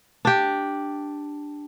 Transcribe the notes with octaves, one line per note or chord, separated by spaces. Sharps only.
D4 G4